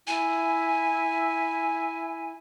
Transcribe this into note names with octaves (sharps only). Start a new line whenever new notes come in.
E4 G#5